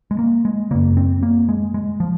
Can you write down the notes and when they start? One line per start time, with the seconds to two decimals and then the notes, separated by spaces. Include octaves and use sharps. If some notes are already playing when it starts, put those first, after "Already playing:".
0.11 G#3
0.19 A#3
0.45 G#3
0.71 F#2 C#3 A#3
0.97 C4
1.23 A#3
1.49 G#3
1.74 G#3
2.00 F3